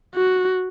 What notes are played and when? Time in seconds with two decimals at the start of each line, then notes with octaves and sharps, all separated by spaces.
0.15 F#4